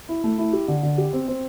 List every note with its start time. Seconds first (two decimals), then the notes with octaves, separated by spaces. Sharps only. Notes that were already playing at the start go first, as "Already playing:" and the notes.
0.09 E4
0.24 A3
0.38 E4
0.53 G4
0.68 D3
0.83 D3
0.98 G4
1.13 C4
1.28 C4